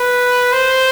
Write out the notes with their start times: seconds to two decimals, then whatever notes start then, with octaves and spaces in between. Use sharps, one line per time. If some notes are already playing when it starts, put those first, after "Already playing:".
Already playing: B4
0.53 C5